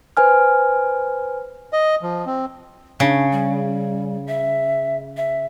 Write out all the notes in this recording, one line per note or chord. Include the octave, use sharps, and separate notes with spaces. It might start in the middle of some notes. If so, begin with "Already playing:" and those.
B4 C5 G#5 F6
D#5
F3
C4
C#3 D4
G3
E5
E5